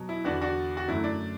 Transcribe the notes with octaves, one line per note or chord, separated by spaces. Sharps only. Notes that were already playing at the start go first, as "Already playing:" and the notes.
Already playing: B2 F#3
E4
E2 D3 B3 D4 F#4
D4 F#4
F#4
F#2 D3 F#3 A3 E4
D4